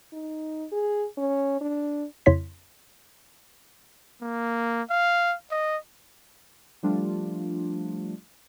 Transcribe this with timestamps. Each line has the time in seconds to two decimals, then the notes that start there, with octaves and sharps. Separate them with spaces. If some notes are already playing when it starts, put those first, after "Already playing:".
0.13 D#4
0.72 G#4
1.18 C#4
1.61 D4
2.26 F2 C#3 E4 C#5 C6 B6
4.22 A#3
4.90 F5
5.51 D#5
6.83 F3 G3 A3 D4 F4